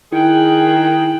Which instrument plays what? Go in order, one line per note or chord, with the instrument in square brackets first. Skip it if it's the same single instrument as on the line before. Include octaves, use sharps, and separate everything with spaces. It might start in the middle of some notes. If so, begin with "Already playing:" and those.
[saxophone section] D#3 G#4 [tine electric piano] E4 [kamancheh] G5 F#6